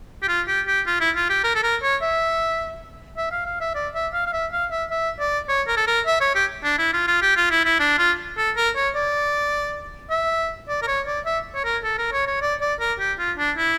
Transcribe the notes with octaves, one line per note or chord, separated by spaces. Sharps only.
G4
F4
G4
G4
F4
E4
F4
G4
A#4
A4
A#4
C#5
E5
E5
F5
F5
E5
D5
E5
F5
F5
E5
F5
E5
E5
D5
C#5
A#4
A4
A#4
E5
C#5
G4
D4
E4
F4
F4
G4
F4
E4
E4
D4
F4
A4
A#4
C#5
D5
E5
D5
A#4
C#5
D5
E5
C#5
A#4
A4
A#4
C#5
C#5
D5
D5
A#4
G4
F4
D4
E4